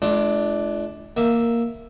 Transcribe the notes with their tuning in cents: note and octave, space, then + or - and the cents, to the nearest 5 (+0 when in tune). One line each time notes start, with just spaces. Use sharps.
G#3 +45 D4 +0 F4 -45
A#3 +0 E5 +0